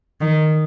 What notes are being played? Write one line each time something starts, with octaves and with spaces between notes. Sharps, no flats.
D#3